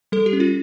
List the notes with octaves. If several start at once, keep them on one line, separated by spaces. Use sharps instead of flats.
G3 A4
G4
C#4
F4